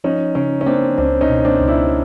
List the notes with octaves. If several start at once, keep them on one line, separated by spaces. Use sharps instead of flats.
F3 C#4 D#4
C#3 C#4 D#4
C#4
A#3 C4 D4
C#2 C4 D4
C#4 D#4
B2
C4 D4
C#2
D4 E4